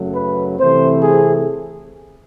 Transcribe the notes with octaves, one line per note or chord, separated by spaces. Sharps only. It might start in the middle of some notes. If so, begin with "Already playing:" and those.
Already playing: F#2 C#3 F#3 A3
B4
C3 E3 A3 C4 C5
G#4